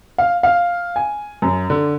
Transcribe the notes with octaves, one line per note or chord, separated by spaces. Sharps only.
F5
F5
G#5
F#2
D3